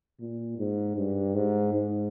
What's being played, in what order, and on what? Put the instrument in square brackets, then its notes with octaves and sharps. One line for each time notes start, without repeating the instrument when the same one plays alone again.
[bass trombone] A#2
G#2
G2
G#2
G#2